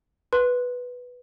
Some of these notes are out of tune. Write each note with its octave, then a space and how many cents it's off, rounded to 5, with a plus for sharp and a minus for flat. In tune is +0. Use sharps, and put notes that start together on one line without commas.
B4 +0 C6 +0